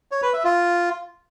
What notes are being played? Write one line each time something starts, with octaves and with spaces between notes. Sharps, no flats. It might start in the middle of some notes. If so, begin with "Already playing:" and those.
C#5
B4
E5
F4